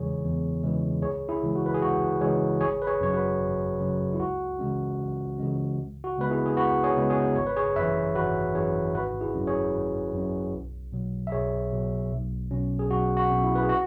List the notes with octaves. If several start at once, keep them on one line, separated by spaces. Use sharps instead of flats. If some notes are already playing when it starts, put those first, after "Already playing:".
Already playing: E2 C#3 E3 G#3 G#4 C#5
E2
C#3 E3 G#3
C#2 G#4 C#5
E4 G#4
C#3 E3 G#3
F#4
B4
G#4
C#2 F#4
C#3 E3 G#3 G#4 C#5
G#1 G#4 C#5
B4
G#4 C#5
F#2 C#3 F#3 C#5
F#4 B4
G#1
F#2 C#3 F#3
E4
C#2 F#4
C#3 E3 G#3 C#4
C#2
C#3 E3 G#3 C#4
C#2
F#4
C#3 G#3 B3 B4
E4 G#4
G#4
C#2 F#4 B4
G#4 C#5
C#3 G#3 B3
G#4 C#5
G#1 C#5
B4
G#4 C#5
F#2 E3 B4 E5
G#1 F#4 B4
F#2 E3 G#4 C#5
G#1 F#4 B4
E4 G#4
F#2 F#3 C#4
G#4 C#5
G#1
F#2 F#3 C#4
B1
B2 F#3
E5
B1 G#4 C#5
B2 F#3
B1
B2 F#3 C#4
G#4
B1 F#4
F#4
B2 F#3 C#4
E4
B4
G#4
F#4